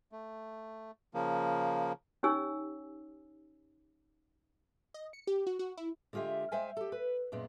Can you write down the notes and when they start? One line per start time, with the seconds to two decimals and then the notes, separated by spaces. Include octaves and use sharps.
0.12 A3
1.14 C#3 F3 A#3
2.23 C#4 D#4 G4 C#5 G#5 E6
4.94 D#5
5.13 C#7
5.27 G4
5.47 F#4
5.59 F#4
5.77 E4
6.13 D3 G#3 F4 G4 E5
6.52 G#3 C5 E5 F5 G5 G#5
6.77 G4 A4
6.92 B4
7.32 F#2 A#2 G#3 B3